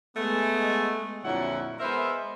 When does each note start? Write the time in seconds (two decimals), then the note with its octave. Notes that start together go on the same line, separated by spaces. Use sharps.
0.17 G#3 A3 B3
1.24 F2 A#2 D3 F#3 E4 F#5
1.80 G#3 B3 A#4 C5 E5